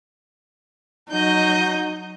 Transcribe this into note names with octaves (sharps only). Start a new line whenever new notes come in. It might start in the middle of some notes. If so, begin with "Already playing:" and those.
F#3 D#4 D#5 G6